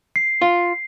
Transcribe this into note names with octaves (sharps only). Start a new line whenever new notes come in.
C7
F4